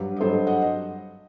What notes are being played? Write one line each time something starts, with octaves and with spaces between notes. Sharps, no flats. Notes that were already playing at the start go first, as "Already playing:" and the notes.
Already playing: G2 F#3 G4 B4
D#5
G2 F#3 A4 C5
D#5 F#5